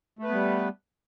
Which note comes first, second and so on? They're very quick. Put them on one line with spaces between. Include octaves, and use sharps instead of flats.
A3 B4 B3 G3